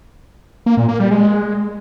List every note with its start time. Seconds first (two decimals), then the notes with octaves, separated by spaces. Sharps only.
0.66 A#3
0.77 A#2
0.89 A#3
1.00 G3
1.11 G#3